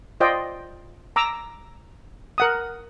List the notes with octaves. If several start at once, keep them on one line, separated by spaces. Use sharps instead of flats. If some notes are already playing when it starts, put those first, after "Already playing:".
F4 C5 D5 D#5 G5
A#5 D6 E6
A#4 F#5 D#6